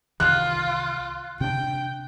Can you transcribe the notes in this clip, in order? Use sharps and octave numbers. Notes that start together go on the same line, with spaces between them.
C2 D#3 E3 F4 F#6
C3 D4 G5